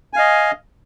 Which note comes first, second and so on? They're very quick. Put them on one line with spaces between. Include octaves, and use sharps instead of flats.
G#5 F5 D#5